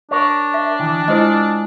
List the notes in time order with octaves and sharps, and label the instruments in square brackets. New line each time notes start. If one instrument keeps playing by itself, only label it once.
[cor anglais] D4 [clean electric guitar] A#4 C#5
[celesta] E5
[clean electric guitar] D#3 E3
[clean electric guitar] G#3 F4 [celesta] E4 C5 D#5